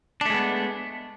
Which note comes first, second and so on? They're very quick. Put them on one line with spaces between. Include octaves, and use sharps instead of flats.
D4 A3 G#3 B3